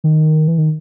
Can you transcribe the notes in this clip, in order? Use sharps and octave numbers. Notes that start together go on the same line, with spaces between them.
D#3
E3
D#3